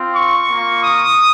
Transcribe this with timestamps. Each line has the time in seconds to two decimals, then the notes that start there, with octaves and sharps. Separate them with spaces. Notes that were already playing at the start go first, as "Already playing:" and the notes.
Already playing: C4 F4
0.15 C#6
0.48 A#3 F4
0.81 D#6